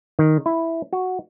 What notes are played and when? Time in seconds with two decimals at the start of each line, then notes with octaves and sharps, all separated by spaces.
0.19 D#3
0.46 E4
0.93 F#4